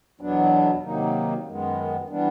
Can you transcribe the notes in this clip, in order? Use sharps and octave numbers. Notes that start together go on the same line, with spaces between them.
E2 B2 F#3 B3 D4
C3 D#3 F#3 A#3 D#4
F#2 D#3 G#3 B3
E3 G3 B3 D4